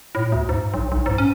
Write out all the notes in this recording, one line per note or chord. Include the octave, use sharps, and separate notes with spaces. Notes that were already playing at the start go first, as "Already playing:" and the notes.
A2
D2
G#2
B1
B1
G#2
C#4